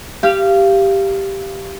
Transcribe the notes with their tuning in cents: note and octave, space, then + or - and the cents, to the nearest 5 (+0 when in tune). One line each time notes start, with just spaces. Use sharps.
G4 +0 F5 -20